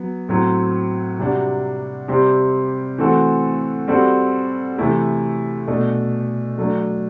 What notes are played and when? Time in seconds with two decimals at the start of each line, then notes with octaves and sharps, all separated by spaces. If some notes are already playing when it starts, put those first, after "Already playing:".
Already playing: F#3 B3
0.29 A2 F#3 C4
1.19 C3 G3 D4 F#4
2.08 C3 G3 C4 G4
2.98 E3 A3 C4 F#4 A4
3.88 G3 C4 F#4 A4
4.78 C3 E3 A3 E4
5.68 B2 A3 D4
6.58 F#3 A3 D4